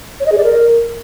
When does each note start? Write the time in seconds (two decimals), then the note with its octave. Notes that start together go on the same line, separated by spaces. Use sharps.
0.20 C#5
0.26 D#5
0.32 G#4
0.38 D5
0.44 A#4